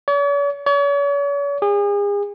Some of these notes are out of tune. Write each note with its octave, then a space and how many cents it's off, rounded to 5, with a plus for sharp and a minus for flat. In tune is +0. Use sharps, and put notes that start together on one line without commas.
C#5 +45
C#5 +40
G#4 -35